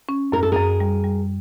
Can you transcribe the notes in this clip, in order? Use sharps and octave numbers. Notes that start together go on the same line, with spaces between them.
C#4
F#2 A#4
A4
F#2 G#4 A#4
G3
G3